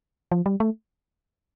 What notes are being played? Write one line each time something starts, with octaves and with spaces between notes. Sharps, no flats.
F3
G3
A3